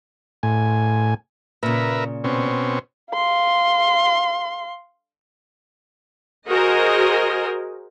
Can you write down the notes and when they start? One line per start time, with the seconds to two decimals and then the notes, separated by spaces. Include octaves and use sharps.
0.43 A2 G#5
1.63 A#2 C#3 A#4 B4 E5
2.24 B2 C4 C#4
3.13 F5 C6
6.49 F#4 G#4 A#4 C5 D#5